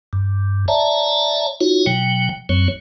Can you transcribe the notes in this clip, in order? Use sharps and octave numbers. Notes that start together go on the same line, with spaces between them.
G2
C#5 D5 E5 A5 A#5
D#4 F4 F#4 C#5
B2 F#3 G5
F#2 F#3 C4 C#5